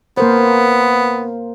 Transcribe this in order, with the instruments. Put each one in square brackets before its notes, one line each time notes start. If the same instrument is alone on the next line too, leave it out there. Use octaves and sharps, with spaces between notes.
[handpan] A#3 A#4 C5 [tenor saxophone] B3